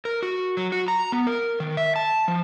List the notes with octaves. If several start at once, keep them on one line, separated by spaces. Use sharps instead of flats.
A#4
F#4
F#3
F#4
A#5
B3
A#4
D#3
E5
A5
F3